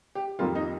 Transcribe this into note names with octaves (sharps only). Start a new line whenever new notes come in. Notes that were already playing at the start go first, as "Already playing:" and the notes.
G4
F2 D#3 G3 A#3 F4
D#4